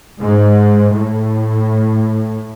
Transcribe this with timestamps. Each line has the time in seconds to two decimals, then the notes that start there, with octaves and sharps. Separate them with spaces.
0.21 G#2
0.93 A2